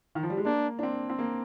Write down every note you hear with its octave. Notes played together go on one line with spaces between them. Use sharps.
D#3
F3
G3
G#3
A#3 D4
D4
C4
C4
A#3